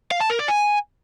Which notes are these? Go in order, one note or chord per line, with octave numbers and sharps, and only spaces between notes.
F5
A5
A#4
D5
G#5